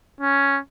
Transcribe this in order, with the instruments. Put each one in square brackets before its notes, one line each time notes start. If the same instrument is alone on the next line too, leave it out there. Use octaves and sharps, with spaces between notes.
[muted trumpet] C#4